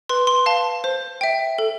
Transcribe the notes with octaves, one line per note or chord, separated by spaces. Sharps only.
B4 C6
C6
F5 A5
C5
E5 G5
A4